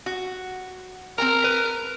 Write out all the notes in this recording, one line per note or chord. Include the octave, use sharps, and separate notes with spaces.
F#4
C4 A#4 G5 A#5
B4